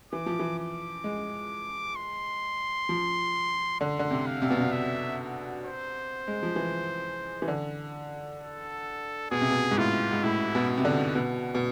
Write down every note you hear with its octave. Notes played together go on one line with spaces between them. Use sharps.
E3 D6
F3
E3
D6
G#3
C6
F3
D3 C6
D3
C3
F5
C3
B2
C3
E5
C5
G#3
F3
E3
E3
D3
A4
B2 G#4
C3
B2
G#2
A2 F4
G#2
A2 E4
B2
C3
D3
B2
B2